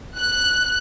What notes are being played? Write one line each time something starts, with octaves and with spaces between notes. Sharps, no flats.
F#6